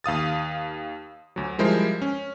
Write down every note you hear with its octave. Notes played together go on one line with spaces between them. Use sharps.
D#2 F5 D#6 A6
D2 F#3
F3 G3 G#3 E4 A#4 C5
C#4